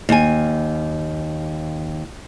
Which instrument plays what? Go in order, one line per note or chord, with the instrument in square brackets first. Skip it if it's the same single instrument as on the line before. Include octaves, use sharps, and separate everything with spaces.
[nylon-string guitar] D#2 G#5